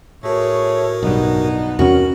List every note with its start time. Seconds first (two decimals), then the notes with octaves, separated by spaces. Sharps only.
0.23 A2 A3 F#4 G#4 A#4 C#5
1.03 B1 G2 B3 D4 D#4
1.79 E2 C3 C#4 F#4 A#4